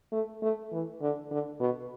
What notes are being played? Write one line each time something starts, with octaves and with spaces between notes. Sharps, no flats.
A3
A3
E3
D3
D3
B2